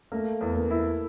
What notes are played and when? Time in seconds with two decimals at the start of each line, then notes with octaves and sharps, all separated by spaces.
0.12 A3 A#3
0.41 E2
0.56 A#3
0.71 E4